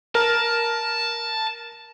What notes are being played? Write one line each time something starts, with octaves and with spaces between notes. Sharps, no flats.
A#4 A5